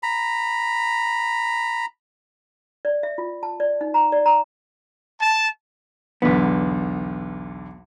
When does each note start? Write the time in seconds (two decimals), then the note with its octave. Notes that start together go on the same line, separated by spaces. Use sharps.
0.03 A#5 B5
2.85 D5
3.03 E5
3.18 F4
3.43 A5
3.60 D5
3.81 D#4
3.94 A#5
4.12 D5
4.26 A#5
5.22 A5
6.22 B1 E2 D3 B3